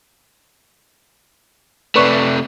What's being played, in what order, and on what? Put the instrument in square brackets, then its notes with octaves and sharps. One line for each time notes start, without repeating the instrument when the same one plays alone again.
[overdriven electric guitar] C3 A3 [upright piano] B4 D5 C#6